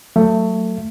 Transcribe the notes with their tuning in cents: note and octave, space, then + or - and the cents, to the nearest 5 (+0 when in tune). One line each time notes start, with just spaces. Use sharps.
F#3 +0 A3 +20